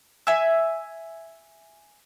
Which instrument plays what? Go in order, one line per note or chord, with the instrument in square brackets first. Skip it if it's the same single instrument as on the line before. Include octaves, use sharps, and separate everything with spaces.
[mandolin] E5 G#5 E6